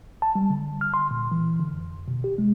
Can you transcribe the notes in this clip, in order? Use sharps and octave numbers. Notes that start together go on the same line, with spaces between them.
A5
G3
D3
F6
C6
A#2
E3
D3
F2
B2
G4
G#3